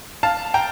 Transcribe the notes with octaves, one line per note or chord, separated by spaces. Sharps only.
F5 A5
G5 A#5